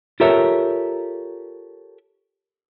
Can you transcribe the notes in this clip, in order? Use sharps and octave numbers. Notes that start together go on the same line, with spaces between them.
F4 G4 A4 A#4 C#5 E5